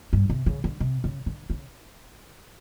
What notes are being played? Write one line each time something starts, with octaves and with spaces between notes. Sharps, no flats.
G2
C3
C#3
D3
C3
C#3
D3
C#3